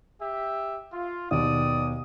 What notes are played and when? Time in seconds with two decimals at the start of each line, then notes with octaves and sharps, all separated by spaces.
0.22 G4 E5
0.92 F4
1.31 D#2 B2 D5 D#6